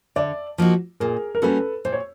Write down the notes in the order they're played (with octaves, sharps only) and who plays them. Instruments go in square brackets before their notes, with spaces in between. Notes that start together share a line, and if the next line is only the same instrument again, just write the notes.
[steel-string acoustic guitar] D3 [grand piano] D5 E5
[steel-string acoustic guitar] F3 A#3 D#4 F#4
[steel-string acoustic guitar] A#2 [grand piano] G#4 A#4
[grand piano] A#4
[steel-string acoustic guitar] G3 A#3 C#4 F#4 [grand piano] A4 B4
[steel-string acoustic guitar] A#2 [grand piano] C5
[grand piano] C#5